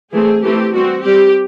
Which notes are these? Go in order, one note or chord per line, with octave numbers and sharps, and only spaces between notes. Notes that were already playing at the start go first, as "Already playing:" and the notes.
E3 A3 C4 G#4
E3 A3 C4 G4
G3 C4 F#4
G3 C4 G4